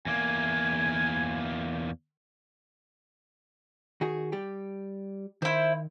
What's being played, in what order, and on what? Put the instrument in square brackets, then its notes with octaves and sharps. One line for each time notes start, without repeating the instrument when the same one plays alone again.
[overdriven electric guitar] E2 A#3 [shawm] G#5
[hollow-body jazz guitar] D#3 F#4 G#4
G3 G4
[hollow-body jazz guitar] D#3 [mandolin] E4 C5